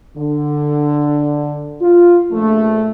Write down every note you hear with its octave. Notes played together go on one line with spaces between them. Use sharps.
D3
F4
A#1 A3